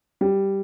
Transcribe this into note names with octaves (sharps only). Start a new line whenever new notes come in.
G3